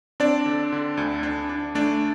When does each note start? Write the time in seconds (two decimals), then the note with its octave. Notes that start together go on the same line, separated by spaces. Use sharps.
0.20 C4 D4 D5
0.46 D3
0.72 D3
0.97 D2
1.23 D4
1.49 D4
1.75 A3 D4 D5